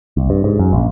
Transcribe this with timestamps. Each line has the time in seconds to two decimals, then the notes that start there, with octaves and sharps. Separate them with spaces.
0.17 C2
0.30 G2
0.44 G#2
0.59 F#2
0.73 A#1